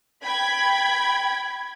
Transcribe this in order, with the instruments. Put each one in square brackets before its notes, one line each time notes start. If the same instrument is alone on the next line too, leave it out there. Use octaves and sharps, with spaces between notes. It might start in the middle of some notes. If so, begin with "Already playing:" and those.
[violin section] G5 B5 G#6